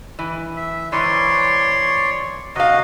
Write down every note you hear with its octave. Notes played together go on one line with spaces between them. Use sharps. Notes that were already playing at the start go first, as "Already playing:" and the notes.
E3
E5
G#2 E3 C#5 D5 C6
C3 F#4 D#5 F5